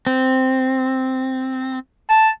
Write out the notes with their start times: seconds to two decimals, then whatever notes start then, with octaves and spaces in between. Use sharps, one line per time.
0.07 C4
2.10 A5